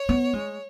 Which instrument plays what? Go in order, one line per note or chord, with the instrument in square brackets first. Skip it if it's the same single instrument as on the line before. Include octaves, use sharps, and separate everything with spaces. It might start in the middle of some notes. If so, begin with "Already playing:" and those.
Already playing: [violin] C#5
[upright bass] B3
G#3